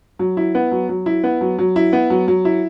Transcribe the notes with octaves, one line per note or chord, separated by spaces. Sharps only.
F#3
E4
B3
F#3
F#3
E4
B3
F#3
F#3
E4
B3
F#3
F#3
E4